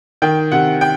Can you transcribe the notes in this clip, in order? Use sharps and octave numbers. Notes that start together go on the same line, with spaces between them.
D#3 G5
C3 F#5
G5